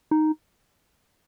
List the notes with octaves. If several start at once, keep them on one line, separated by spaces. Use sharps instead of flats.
D#4